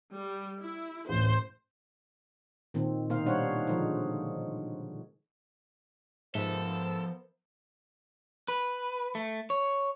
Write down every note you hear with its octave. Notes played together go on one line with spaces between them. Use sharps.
G3
E4
D1 A1 C5
A#2 D#3 C4
B2 A#3 D#4 C5 F5
G3 D4 D#4 C5 C#5 F#5
D3 F3 G#3 D#4
G#2 F3 B3 A4 A#4 C5 E5
B4
A3
C#5